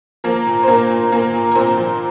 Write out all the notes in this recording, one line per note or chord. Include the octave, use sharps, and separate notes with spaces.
F3 A#3 A#4
A#2
C5
A#2 A#3 A#4
A#2
A#2 A#3 A#4
A#2
A#4
A#2 C4 C5
F3